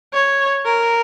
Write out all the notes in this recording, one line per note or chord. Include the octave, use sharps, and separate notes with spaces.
C#5
A#4